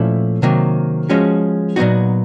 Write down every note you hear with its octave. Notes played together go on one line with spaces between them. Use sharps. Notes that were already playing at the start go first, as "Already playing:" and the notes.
Already playing: A#2 F3 A3 C#4 E4
C3 D#3 F#3 A#3
F3 G#3 C#4 F#4
A#2 F#3 B3 D#4 F#4